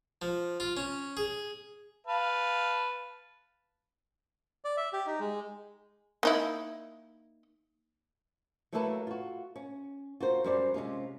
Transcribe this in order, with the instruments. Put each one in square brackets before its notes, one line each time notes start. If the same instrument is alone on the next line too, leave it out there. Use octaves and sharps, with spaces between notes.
[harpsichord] F3
F4
C#4
G#4
[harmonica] B4 F5 A5
[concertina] D5
E5
G4
D#4
G#3
[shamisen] A#3 D#4 E4
[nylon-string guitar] F#3 A3 A#3 E4 A4 B4
F4 F#4
C#4
F4 F#4 A#4 C5
F#2 F#3 G3 C4 C5 D5
C3 G#3 C#4 F4